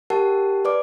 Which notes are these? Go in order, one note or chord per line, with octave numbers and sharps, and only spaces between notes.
G4 A#4 F#5 A5
B4 D5 D6